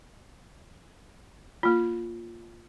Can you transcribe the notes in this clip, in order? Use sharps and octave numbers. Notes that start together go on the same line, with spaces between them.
A#3 F4